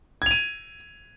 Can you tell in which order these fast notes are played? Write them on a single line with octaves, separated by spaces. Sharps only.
G#6 F7 D#7